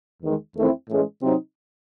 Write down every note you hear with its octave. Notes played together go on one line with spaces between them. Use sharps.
E2 D#3 G#3
E2 D#3 A3 C4 E4
A2 E3 G#3 C#4
C3 F#3 C4 D#4